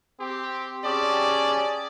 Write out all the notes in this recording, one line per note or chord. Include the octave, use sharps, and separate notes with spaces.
C4 G4
C#4 G4 G#4 D5 A5